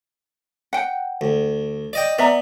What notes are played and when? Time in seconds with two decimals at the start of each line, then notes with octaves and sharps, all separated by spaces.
0.73 F#5 G5
1.21 D2
1.93 D5 D#5 G5
2.18 B3 D5 E5 A#5